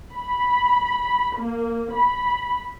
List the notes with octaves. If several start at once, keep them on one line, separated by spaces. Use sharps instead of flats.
B5
A#3
B5